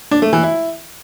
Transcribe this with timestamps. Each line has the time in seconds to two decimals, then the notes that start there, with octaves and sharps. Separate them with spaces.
0.11 D4
0.22 A3
0.33 E3
0.43 E4